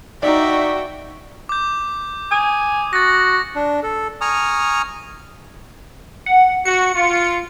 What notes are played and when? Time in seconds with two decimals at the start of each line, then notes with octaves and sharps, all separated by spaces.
0.23 D#4 F#4 D5 E5 G5
1.49 D6 G6
2.31 G#5 D#6
2.93 F#4 A6 A#6
3.55 D4
3.83 A4
4.21 G#5 A#5 C#6 D#6 F6
6.26 F#5
6.65 F#4 C#7
6.94 F4